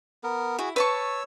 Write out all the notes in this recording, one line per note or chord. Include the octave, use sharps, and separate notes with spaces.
B3 A#4
E4 F#4 G#4
B4 C#5 A5 C#6 E6